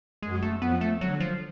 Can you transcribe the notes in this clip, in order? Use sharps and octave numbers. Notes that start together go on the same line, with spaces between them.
F#2 F#3 G#3
A3
F2 F3 B3
A3
D3 F#3
F3